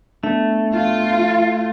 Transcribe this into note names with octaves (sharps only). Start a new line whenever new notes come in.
A3 B3 D4
F4